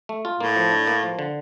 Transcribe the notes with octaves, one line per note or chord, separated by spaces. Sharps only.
A3
F4
A2 A#3
F3
D4
A#3
F3
D3